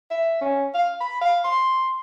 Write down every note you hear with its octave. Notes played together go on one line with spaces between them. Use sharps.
E5
C#4
F5
B5
F5
C6